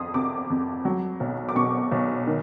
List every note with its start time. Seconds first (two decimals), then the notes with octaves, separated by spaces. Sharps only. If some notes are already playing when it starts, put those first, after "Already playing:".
Already playing: F2 C6 D#6
0.14 C3 D6
0.50 F2
0.85 F#3
1.20 B1
1.49 D6
1.55 B2 C#6
1.92 B1
2.27 D#3